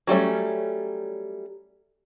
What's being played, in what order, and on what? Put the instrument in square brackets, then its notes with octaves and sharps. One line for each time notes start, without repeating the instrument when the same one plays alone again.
[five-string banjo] F#3 G3 A3 C#4